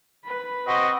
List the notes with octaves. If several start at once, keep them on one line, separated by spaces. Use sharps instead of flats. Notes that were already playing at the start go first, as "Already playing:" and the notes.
B4 B5
C4 F#4 D#5